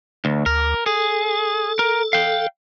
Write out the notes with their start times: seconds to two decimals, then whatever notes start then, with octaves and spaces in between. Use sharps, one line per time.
0.25 D2
0.46 D2 A#4
0.86 G#4 A4
1.79 A#4
2.13 F5 G5